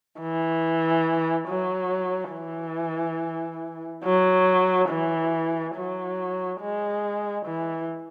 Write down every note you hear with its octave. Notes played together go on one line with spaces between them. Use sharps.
E3
F#3
E3
F#3
E3
F#3
G#3
E3